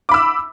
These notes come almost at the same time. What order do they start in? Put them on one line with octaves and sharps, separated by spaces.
D6 B5 E6